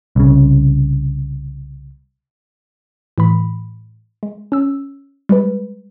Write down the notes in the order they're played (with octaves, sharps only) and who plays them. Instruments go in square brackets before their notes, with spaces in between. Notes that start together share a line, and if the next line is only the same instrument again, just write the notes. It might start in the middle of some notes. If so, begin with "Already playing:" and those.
[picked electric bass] C2 C#3
[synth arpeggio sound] A2 E3 B5
G#3
C#4 E6
G3 G#3 B4